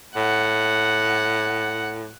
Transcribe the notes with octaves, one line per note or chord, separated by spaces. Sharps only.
A2 F#5